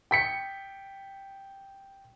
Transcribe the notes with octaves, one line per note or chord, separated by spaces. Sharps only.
G5 B6 C#7